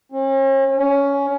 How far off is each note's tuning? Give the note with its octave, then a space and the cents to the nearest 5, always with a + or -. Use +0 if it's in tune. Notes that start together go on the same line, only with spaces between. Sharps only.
C#4 -45
C#4 +15